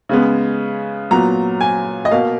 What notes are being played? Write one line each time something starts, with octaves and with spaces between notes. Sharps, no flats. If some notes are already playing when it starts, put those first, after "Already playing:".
C#3 G#3 B3
A#2 F#3 B3 A#5
G#5
D#5
B2 A#3 F5